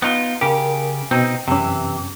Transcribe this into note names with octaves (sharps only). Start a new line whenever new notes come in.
B3 D#4 F4
C#3 G4 A#4
B2 C4 D#4
F#2 C3 E3 C#4